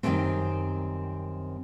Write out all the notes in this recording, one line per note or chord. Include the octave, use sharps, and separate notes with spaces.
F#2 D#3 F#3 G3 A3 C4